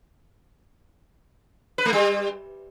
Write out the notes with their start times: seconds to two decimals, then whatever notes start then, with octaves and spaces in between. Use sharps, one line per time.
1.78 B4
1.85 A3
1.93 G3